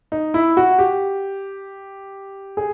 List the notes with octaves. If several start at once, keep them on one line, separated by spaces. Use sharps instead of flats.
D#4
E4
F#4
G4
G#4